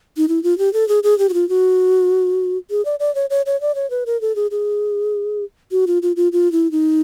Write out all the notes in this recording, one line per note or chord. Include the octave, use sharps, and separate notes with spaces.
D#4
E4
F4
G4
A4
G#4
G#4
G4
F#4
F4
F#4
G#4
D5
D5
C#5
C#5
C#5
D5
C#5
B4
A#4
A4
G#4
G#4
F#4
F4
F4
F4
F4
E4
D#4